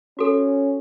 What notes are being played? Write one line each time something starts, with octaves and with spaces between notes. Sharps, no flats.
C#4 F#4 A4